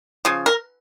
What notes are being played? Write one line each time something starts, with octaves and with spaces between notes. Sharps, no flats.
C#3 F3
A#4